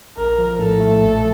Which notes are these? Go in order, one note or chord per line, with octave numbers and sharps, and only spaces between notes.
A#1 A#4
F3
A2 A4
A3
A#1